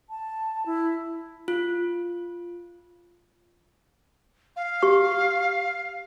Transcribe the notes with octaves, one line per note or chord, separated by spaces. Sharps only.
A5
E4
F4
F5
G4 C#6